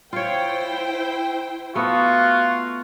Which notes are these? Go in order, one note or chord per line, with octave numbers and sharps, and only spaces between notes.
E4 F4 C5 C#5 G5
A3 B3 F4 F#4